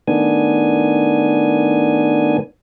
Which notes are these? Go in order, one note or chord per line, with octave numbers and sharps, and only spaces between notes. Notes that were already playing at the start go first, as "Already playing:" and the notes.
A2 D#3 B3 D4 G#5